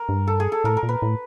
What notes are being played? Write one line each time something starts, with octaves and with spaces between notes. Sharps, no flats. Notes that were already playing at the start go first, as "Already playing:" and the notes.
Already playing: A#4
G2
A4
G#4
A4
A2 A#4
A#4
A#2
B4
A2